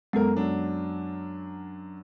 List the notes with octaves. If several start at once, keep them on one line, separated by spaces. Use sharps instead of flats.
F#2 G#3 B3 A4 A#4
F#2 F#3 D4